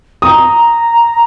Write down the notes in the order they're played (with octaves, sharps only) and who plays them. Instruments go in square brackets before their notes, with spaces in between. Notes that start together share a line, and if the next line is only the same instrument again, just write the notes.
[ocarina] A#5 [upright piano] D#6